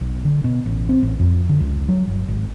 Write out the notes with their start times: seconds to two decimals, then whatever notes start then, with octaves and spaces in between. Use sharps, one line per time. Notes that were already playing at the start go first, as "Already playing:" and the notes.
0.01 B1
0.25 D3
0.44 B2
0.66 A1
0.89 C4
1.03 A1
1.19 F2
1.49 D3
1.61 C#2
1.88 F#3
2.07 G1
2.28 G#1